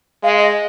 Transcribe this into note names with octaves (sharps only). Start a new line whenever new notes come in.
G#3 F5
D#5